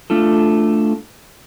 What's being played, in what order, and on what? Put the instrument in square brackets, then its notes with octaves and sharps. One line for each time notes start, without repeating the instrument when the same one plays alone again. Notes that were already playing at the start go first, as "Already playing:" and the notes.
[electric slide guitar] A3 D4 F4 A4